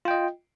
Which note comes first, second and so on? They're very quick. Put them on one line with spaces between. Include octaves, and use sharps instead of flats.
F4 G5 D#5